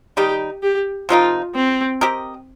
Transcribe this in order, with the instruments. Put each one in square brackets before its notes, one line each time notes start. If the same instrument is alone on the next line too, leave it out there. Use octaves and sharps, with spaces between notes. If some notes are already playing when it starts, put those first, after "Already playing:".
[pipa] D#3 G3 D#4 [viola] G4
[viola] G4
[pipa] C3 F3 D#4 A#4 [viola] F4
[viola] C4
[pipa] C4 G4 A#4 D#5